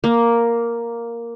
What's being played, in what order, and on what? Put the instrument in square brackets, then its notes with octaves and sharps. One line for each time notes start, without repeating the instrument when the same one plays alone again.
[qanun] A#3